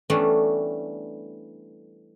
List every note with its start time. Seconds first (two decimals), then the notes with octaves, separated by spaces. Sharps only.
0.10 E3 G3 A3 B3 C#4 D4